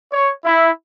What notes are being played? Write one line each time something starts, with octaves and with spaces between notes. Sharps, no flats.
C#5
E4